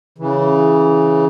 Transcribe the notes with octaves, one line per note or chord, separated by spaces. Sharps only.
C#3 E3